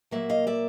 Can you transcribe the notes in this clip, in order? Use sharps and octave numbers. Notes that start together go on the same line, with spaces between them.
A#2 F#3 A#3 E5 F#5
D#5 F5
D5 E5